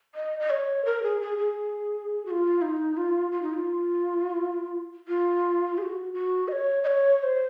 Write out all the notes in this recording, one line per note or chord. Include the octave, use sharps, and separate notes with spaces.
D#5
D#5
C#5
A#4
G#4
G#4
G#4
F#4
F4
D#4
F4
F4
D#4
F4
F4
G#4
F#4
F#4
D#5
C#5
D#5
C#5
C#5
C5